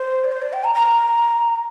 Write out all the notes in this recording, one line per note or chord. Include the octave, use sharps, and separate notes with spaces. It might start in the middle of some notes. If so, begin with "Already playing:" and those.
Already playing: C5
D5
C5
D5
G5
A#5
A#5